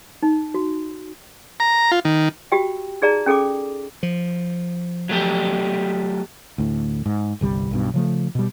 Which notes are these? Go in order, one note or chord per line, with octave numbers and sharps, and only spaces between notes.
D#4
F#4
A#5
F4
D#3
F#4 G4 G5
D#4 G#4 D5 A#5
C#4 G#4 A4 G5 D6
F3
F#3 A3 G4
D2 A2
G#2
G1 C2 G3
B1 G2 B2
C#3 F3 A3
B2 G3